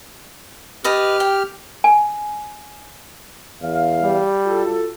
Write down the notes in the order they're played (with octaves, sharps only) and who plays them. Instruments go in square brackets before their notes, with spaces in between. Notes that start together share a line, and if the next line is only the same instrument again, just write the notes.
[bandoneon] G4 F6 [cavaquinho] B4 D#5 A5
[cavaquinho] G5
[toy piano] G#5
[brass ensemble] E2 E3 F5
[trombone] G3
[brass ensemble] F4 F#4 A4